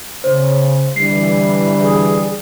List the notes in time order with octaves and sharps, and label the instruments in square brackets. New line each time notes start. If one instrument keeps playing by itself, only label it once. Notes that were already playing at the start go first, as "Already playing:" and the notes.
[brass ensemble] C#3 [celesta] C5
[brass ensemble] D3 E3 G3 [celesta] C7
[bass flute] G#4